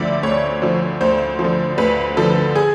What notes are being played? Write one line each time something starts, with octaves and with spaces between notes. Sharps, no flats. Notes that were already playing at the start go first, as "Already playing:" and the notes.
Already playing: D2 D3 F3 D5 E5
D2 C#5
D3 F3
D2 C5
F3
D3
D2 B4
D3 F3 A4
G#4